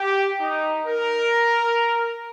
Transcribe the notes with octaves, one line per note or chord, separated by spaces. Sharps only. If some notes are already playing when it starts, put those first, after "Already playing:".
Already playing: G4
D#4
A#4